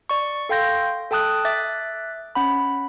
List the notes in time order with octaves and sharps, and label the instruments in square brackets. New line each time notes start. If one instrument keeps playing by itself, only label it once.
[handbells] D5 C#6
A4 F5 G5 C6 G6 A#6
A4 G5 A5 D#6 F#6
E5 D6 F#6 A6
C#4 F#5 B5